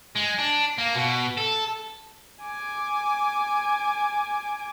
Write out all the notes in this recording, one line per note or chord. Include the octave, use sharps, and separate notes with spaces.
G#3
D4
A#3
B2
A4
G#5 D6